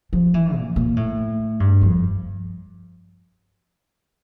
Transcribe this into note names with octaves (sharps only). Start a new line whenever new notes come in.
F3
E3
A#2
A#2
A2
G2
F2